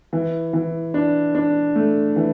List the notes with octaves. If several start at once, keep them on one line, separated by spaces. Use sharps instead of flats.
E3
E3
D4
D4
A3
E3